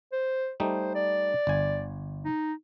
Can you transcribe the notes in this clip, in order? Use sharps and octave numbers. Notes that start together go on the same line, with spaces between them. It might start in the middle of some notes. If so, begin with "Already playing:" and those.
C5
G3 A3 D#4 C5
D5
G1 G#5
D#4